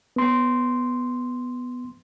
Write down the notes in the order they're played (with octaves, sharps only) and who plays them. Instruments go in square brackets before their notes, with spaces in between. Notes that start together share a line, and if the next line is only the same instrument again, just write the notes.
[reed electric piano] B3 C6